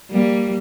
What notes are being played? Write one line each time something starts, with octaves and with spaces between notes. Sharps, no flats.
G3 A#3